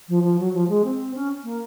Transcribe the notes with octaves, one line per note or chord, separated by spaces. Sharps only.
F3
F3
F#3
F3
G#3
C4
C#4
A#3